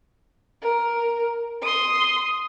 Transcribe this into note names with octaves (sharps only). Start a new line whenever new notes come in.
A#4
C6 D#6